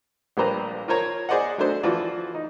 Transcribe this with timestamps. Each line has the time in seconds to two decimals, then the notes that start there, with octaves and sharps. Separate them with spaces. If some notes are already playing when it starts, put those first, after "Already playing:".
0.37 A#1 G3 A#3 B4 C5 A#5
0.88 F4 A#4 C5 C#5 A#5
1.29 G#4 C5 D5 D#5 F#5
1.58 F#3 A3 D4 C5
1.83 E3 F3 F4 F#4 D5
2.34 D#4